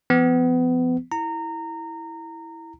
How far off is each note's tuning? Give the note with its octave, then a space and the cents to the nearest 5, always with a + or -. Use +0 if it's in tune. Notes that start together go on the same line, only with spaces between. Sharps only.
F3 -30 B3 +30
E4 -5 A#5 -20